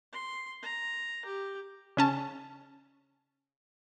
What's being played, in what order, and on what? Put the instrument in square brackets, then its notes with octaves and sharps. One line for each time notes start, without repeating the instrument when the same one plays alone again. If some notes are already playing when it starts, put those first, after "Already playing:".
[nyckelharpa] C6
A#5
G4
[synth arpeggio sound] C#3 C#4 A5